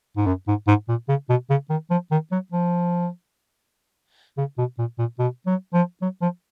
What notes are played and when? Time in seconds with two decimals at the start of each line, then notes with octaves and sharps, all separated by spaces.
0.17 G#2
0.26 F#2
0.48 G#2
0.67 G#2
0.88 A#2
1.08 C#3
1.29 B2
1.50 C#3
1.70 D#3
1.90 F3
2.11 D#3
2.32 F#3
2.52 F3
4.37 C#3
4.58 B2
4.78 A#2
4.98 A#2
5.19 B2
5.46 F#3
5.73 F3
6.02 F#3
6.21 F3